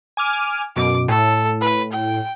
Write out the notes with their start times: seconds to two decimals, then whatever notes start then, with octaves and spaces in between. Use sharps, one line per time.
0.17 G#5 D6 F6
0.76 F#2 B2 D6
1.08 A2 A4
1.61 B4
1.92 G5